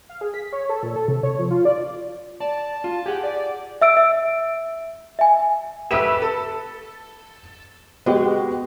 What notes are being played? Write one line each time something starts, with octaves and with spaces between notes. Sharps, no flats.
F5
G#4
B6
C#5
A4
A#2
A4
C3
C#5
F3
F4
D5
D5 A5
F4
G4 G#4 F#5
D5
E5 E6 D7
E5
E5 G#5
A3 G4 B4 E6 B6 E7
A4
G#3 B3 F#4 G4